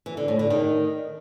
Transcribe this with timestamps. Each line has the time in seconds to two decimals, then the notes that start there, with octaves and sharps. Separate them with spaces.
0.06 E3
0.17 D3
0.28 A2
0.39 D3
0.50 D#3